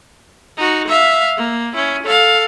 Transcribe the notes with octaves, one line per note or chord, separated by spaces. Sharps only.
D#4 F#4
E5 F5
A#3
C#4 E4
A4 F5